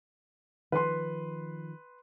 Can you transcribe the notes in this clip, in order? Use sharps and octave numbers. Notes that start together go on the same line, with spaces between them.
D#3 F3 B4 C6